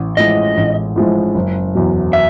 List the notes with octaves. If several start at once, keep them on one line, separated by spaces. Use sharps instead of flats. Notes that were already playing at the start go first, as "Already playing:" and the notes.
Already playing: A1
A2 F3 G#3 D#5
A1
A2 F3 G#3
F#1
E2 B2 F#3
E5